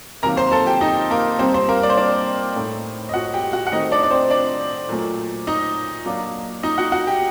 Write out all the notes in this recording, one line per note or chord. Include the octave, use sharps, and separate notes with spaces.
C3 D#3 F#3 A#3 A#4 A#5
C5 C6
A4 A5
G4 G5
D#4 D#5
A#3 A#4
C3 G3 C4 D#4 C5
C4 C5
A#3 A#4
D5
C5
D4 D5
A2 A3 D#4
D#5
F#4 F#5
G4 G5
F#4 F#5
F#5
D#3 A3 C4 D#4 D#5
D4 D5
D5
C4 C5
D4 D5
A#2 F#3 A3
D#4 D#5
F#3 A#3 D4
D#4 D#5
F#4 F#5
F#4 F#5
G4 G5